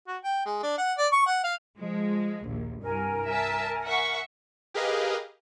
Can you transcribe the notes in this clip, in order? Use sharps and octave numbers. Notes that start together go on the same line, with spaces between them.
F#4
G5
G#3
D4
F#5
D5
C#6
F#5
F5
F3 G#3
A#1 D#2
C2 G2 A#4 G#5
E5 A5
E5 F#5 C#6
G4 G#4 A#4 B4 D#5 F5